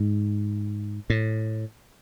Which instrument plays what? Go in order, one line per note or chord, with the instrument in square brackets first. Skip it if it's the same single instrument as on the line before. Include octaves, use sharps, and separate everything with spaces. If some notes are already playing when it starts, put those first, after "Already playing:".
Already playing: [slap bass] G#2
A2